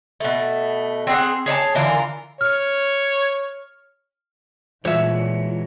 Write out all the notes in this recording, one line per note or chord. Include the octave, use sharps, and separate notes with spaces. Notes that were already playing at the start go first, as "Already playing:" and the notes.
B2 A3
C4 D4 G#4 F#5
G#4 C#5 D5 A5
D3 E3 F4 A#4
C#5 F6
A#2 E3 G#3 F4 F#4 C#5 E5